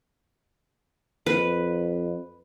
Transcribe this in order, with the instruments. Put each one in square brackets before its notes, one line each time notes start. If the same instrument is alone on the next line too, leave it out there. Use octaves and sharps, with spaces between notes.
[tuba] F2 [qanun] B4